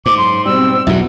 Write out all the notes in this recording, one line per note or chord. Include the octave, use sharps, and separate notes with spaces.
G#2 C5 D6
F#2 C6
B2 G3 C4 E6
B1 E2 G2 B2 F#3 E4 E5